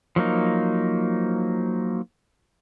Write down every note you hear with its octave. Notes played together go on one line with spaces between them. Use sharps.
F3 F#3 A#3 D#4